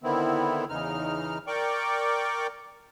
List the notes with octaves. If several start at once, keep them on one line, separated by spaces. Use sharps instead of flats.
D3 D#3 B3 C4 E4
E2 C#3 D#4 F6
A#4 D5 G5 C#6 D6